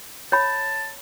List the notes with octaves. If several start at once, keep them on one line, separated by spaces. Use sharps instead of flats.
C#5 A5 B5